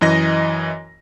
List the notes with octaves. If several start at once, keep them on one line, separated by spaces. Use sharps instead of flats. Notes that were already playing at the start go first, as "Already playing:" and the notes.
F#2 E3 D#5 A#6